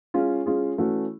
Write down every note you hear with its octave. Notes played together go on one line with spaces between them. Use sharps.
G#3 C#4 F4 G#4
G#3 C#4 F4 G#4
E3 A3 C#4 F#4